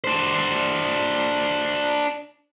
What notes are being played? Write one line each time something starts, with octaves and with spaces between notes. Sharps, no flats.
D4 C5